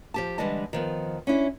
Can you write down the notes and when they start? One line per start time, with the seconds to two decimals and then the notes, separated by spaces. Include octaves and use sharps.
0.14 F3 G4 A5
0.38 D3 E3 G3 G#3 D#5 A5
0.73 D#3 F3 B3
1.27 C#4 D4 E4